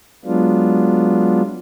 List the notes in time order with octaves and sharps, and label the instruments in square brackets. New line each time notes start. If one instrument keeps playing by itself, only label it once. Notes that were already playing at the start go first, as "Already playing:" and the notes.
[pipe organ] F#3 G#3 B3 D4 F4